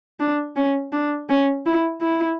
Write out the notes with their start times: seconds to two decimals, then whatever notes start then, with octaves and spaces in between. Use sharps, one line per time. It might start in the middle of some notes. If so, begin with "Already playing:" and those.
0.20 D4
0.56 C#4
0.92 D4
1.29 C#4
1.66 E4
2.01 E4